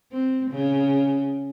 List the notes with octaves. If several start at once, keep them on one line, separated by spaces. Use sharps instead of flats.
C4
C#3